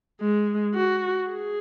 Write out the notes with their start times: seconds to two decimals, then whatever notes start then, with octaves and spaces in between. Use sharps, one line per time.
0.21 G#3
0.74 F#4
1.30 G#4